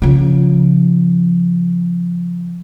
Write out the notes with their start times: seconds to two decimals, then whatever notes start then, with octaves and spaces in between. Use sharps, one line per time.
0.02 C#3 F3